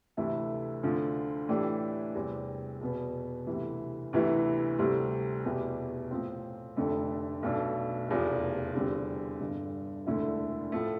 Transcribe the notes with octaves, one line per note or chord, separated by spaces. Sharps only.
D2 C3 E3 A3 E4
D2 D3 F3
A2 E3 A3 D4 G4
E2 C3 G3 C4
E2 B2 B3
D2 C3 E3
D2 C3 E3 B3 E4
D2 C3 G3 C4
E2 B2 B3 E4 G4
A2 F3 C4
F1 F2 D3 A3
B1 B2 A3 D4
F1 E2 C3 F3
E2 D3 G3 C4
G1 G2 D3
E1 D2 D3 A3 E4
A2 F3 A3